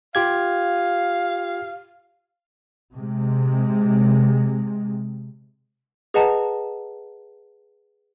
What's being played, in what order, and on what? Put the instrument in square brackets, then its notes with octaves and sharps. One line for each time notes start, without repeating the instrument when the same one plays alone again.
[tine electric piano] F4 G4 G#6 [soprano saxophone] F5
[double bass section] C3 G#3
[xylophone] G#4 B4 D#5 F#5 A5 A#5